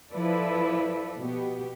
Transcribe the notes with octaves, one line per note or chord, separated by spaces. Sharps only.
F3 E4 A4 B4 D5
B2 B3 G4